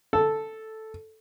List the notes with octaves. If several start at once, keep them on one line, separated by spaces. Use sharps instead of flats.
A4